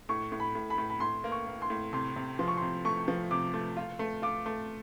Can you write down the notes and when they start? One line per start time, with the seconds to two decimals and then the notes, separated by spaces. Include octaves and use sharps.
0.09 A2 C#6
0.32 A2
0.40 B5
0.55 A2
0.70 B5
0.78 A2
0.90 B5
1.00 A2 C6
1.24 A#3
1.32 C#6
1.47 A#3
1.62 C6
1.70 A2
1.93 C3 C6
2.16 C3
2.38 F3 C6
2.48 C#6
2.57 C6
2.62 C3
2.85 A3 C#6
3.08 F3
3.31 C3 D6
3.54 A3
3.77 F4
3.99 A3
4.22 F4 D6
4.46 A3